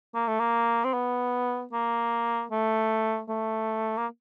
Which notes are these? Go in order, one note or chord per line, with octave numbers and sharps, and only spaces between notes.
A#3
A3
A#3
C4
B3
A#3
A3
A3
A#3